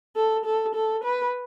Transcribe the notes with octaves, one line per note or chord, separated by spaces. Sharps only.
A4
A4
A4
B4